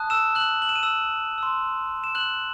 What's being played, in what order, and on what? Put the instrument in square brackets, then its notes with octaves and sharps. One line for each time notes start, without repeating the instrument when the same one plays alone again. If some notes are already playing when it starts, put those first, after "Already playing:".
Already playing: [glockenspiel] A5 D#6 F#6
E6 E7
F#6 F#7
F#7
E7
D#7
E6 E7
C6 E6
E7
F#6 F#7